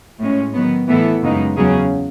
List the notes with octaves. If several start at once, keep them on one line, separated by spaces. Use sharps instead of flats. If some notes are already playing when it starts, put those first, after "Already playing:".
A2 G#3 C#4
D#3 F#3 B3
A2 E3 B3 E4 A4
F#2 C#3 G#3 B3 D#4
E2 C#3 F#3 C#4 G#4